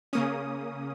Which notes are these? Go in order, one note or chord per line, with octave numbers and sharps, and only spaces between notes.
C#3 A#3 C#4 D#6